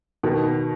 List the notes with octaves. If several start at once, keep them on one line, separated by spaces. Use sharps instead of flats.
B2 D#3